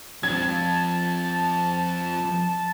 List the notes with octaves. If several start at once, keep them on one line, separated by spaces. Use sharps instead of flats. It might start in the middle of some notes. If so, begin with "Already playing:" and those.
F2 A5 G#6